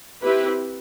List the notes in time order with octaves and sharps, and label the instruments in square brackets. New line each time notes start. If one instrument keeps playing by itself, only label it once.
[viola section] C4 E4 G4 B4